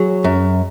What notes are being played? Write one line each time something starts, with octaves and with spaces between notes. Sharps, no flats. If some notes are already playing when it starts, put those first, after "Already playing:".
Already playing: F#3 G#4
F#2